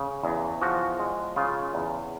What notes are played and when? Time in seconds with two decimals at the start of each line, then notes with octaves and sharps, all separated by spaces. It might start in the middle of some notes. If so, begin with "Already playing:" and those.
Already playing: C#3
0.23 E2
0.61 F3 F#4
0.99 G#3
1.36 C#3 F4
1.74 E2